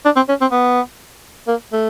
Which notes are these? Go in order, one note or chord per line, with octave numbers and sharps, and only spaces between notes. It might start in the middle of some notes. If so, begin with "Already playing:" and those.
D4
C4
C#4
C4
B3
A#3
A3